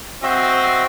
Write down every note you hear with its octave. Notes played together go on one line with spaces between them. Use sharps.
C4 F#4 D#5 E5